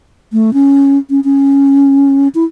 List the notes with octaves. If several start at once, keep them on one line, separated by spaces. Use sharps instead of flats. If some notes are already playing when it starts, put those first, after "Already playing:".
A3
C#4
C#4
C#4
E4